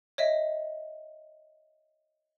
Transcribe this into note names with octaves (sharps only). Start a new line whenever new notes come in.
C#5 D#5 E5